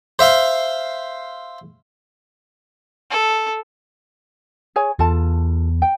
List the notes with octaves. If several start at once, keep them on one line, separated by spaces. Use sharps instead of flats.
C5 E5 F5 C6
A4
G#4 C#5 G#5
E2 F4 A4 A5
G5